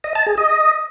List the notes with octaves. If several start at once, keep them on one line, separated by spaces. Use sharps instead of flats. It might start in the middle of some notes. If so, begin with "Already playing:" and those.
D#5
A5
G#4
D#5